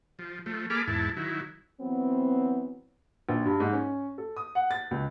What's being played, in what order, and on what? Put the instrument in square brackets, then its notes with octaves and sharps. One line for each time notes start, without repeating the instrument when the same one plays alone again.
[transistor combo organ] F3
F3 A3
A#3 G#4 A4 B5 D6 F6
E2 G#2 E4 A5
D#3 F#3 E4
[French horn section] E3 F#3 B3 C4
[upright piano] A#1
G2
G#2
C#4
A4
D#6
F#5
A6
C#2